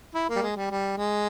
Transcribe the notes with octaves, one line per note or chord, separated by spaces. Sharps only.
E4
A#3
G3
G#3
G3
G3
G#3